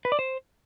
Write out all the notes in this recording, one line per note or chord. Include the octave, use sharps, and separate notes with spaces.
B4
D5
C5